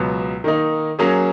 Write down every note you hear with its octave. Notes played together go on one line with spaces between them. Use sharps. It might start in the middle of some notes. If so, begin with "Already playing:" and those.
Already playing: C#2 B2 F#3 B3
D#3 A#3 D#4
F#3 A#3 C#4 G#4